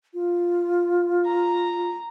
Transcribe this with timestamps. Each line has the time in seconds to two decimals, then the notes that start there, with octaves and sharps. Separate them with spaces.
0.14 F4
1.26 A#5